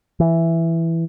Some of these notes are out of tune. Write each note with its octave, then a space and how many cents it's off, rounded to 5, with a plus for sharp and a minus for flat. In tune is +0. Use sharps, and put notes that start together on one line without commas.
E3 +5